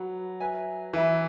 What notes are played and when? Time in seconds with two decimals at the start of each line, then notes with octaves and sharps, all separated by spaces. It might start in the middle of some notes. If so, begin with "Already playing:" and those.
Already playing: F#3 B4 F#5 B5
0.40 B4 E5 G#5
0.93 E3 G#4 E5 B5